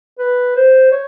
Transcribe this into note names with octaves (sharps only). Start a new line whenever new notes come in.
B4
C5
C#5